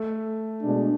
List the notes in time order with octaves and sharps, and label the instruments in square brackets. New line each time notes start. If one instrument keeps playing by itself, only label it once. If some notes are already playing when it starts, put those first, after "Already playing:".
Already playing: [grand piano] A3
[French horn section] B2 G#3 D4